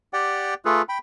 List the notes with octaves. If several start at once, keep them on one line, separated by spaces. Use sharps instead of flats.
G4 D5 F#5 G5
A3 F4 G#4 A4 B4
G5 B5